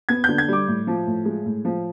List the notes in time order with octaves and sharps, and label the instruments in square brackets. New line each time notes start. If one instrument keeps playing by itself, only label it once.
[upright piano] B3 G#6
G6
D3
G#6
G3 D6
A2
F3
A2
G#3
A2
F3